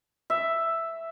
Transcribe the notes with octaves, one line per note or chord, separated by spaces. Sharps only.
E5